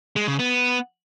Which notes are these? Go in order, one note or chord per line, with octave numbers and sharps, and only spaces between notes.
G#3
C#3
B3